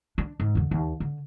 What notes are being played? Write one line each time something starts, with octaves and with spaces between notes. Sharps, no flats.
D4
G#2
E2 D3
D#2
D3